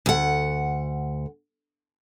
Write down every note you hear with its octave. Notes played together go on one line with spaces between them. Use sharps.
D2 F#5